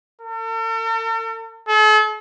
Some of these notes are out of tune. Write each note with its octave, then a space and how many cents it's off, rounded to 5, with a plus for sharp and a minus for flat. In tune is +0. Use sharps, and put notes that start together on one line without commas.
A4 +45
A4 -45